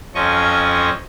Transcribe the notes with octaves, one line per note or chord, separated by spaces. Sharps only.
F2 F3 C#4 D#5 C#6